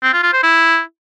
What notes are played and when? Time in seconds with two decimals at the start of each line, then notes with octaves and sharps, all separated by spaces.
0.03 C4
0.13 F4
0.23 F4
0.33 C5
0.43 E4